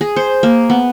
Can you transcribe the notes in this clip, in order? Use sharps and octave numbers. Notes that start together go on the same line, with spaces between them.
G#4
C5
A#3
B3